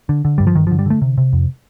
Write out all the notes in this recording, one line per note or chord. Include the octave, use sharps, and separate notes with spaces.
D3
D3
G2 G3
F3
G2 D#3
F3
D3
G3
D3 A3
C3
C3
F2